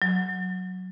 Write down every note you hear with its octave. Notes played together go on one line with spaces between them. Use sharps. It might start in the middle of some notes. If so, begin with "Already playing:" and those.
F#3